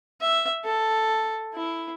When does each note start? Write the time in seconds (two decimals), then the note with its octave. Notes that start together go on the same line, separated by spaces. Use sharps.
0.20 E5
0.64 A4
1.54 E4